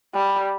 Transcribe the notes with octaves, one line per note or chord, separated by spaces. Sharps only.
G3